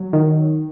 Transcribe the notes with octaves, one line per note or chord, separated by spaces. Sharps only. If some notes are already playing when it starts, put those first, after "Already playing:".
Already playing: F#3
D#3